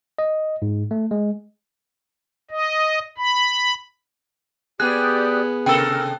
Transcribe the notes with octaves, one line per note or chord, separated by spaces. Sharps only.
D#5
G#2
A3
G#3
D#5
B5
B3 G4 G#4 D5 D#6 F#6
C3 A4 A#4 G5 E6